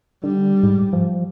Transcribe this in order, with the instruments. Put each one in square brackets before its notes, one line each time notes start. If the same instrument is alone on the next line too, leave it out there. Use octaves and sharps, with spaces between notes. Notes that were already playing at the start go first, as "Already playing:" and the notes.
[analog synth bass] D3 [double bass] G3
[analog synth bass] G#2
F3